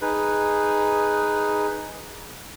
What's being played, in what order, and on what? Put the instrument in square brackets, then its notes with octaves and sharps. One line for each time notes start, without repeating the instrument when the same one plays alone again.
[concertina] D#4 G#4 B4